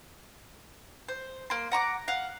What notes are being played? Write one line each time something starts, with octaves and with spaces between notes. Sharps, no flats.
C5
A#3 C6
F#5 A#5 C#6 D6
F5 F#5